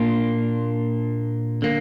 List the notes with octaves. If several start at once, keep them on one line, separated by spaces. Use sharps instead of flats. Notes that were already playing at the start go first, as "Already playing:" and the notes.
Already playing: A#2 A#3 D4 F4
D3 A#3